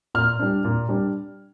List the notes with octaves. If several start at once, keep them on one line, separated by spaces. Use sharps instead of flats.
A#2 F6
G3 D4
A#2
G3 D4